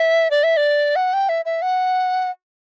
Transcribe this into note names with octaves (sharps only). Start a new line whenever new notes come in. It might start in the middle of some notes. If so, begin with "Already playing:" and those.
Already playing: E5
D5
E5
D5
F#5
G5
E5
E5
F#5